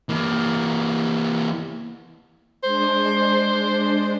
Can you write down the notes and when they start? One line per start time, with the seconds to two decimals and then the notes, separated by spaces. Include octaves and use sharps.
0.09 E3 A#3
2.64 G#3 D4 C5